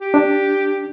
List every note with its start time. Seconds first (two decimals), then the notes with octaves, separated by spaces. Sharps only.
0.01 G4
0.14 D4